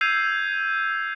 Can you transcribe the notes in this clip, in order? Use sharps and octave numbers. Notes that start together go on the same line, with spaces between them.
E6 G6 G#6 C7 D#7 F7